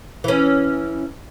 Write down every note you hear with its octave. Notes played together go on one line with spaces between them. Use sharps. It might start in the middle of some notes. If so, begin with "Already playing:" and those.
E3 C#4